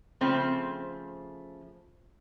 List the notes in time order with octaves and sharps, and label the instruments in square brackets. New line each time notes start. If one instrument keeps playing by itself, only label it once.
[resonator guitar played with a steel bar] C#3 F3 A3 C4